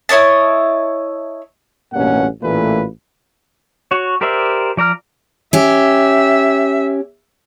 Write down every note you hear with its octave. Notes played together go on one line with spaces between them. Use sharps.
E4 C#5 D#5 A5
A1 G2 B2 A#3 C#4 F#5
A1 A#2 E3 A3 F4 B4
F#4 C#5
G4 A#4 C5 D5 E5
F3 D5 A#5 F6
C#4 G4 E5